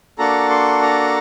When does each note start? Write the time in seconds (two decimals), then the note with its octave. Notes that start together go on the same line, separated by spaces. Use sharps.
0.18 A#3 D4 F#4 A4 A#5
0.51 C6
0.82 A#5